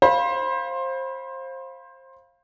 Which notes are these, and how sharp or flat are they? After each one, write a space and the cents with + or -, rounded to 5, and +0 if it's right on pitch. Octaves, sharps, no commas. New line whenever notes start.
C5 +20 F5 +0 B5 -15